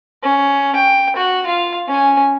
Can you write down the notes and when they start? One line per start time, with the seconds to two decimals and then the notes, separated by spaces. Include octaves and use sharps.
0.23 C#4
0.75 G5
1.16 F#4 F#5
1.46 F4 F5
1.88 C#4 G#5